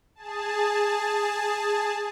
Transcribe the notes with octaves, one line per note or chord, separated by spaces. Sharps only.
G#4 A5